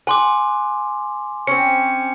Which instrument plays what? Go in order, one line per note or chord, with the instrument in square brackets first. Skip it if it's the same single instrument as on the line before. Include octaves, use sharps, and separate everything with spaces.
[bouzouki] F#5 [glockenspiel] G#5 C6 D6
[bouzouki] C4 C#4 [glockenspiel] C#7